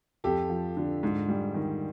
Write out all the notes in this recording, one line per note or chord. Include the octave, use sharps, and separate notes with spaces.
F2 G4 A4
F3
D3
G#2
G3
D#3